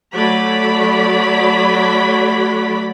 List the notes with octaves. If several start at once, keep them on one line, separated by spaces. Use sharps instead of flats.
F#3 A3 D5 B5